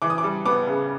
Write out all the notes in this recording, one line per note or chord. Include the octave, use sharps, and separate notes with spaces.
E3 D6
D#6
D6
G3
B3 D6
C#3